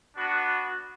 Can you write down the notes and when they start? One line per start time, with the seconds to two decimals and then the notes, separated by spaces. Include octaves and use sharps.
0.16 B3 D4 F#4